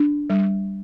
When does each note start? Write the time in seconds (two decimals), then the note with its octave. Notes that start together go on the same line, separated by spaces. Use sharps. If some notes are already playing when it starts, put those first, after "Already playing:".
Already playing: D4
0.30 G3